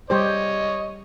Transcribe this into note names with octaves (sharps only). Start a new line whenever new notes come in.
G3 G4 C5 C#5 D#5